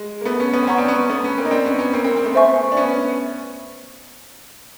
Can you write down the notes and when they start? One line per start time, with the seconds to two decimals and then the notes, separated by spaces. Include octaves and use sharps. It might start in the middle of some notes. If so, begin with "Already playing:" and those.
Already playing: G#3
0.21 A#3
0.25 A3 B3
0.40 B3 C#4
0.53 B3 C#4
0.63 C4
0.67 B3 C#4 F#5 A#5 C#6
0.78 C4 D4
0.88 B3 C#4
1.09 A3 B3
1.24 B3 C#4
1.37 A#3 C4
1.45 D#4
1.51 C4 D4
1.65 B3 C#4
1.79 B3 C#4
1.93 A#3 C4
2.04 A#3 C4
2.17 C4
2.24 A3 B3
2.35 C5 E5 G#5 C#6
2.72 D4
2.77 B3 C#4